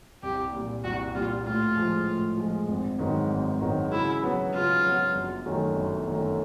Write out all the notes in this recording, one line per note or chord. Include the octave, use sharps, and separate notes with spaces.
C2 G4
A#2 G3
C2 F#4
A#2 G3 F4
A2 F4
F3 G#3
A2
F3 G#3
G#1
G#2 D#3 F#3 B3
G#1
G#2 D#3 F#3 B3
C#3 E4
F#3 B3
C#3 F4
F#3 B3
G1
F#2 D#3 F#3 A3
G1
F#2 D#3 F#3 A3